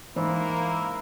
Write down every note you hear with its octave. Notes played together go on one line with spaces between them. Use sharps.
G#2 E3 A#3 E4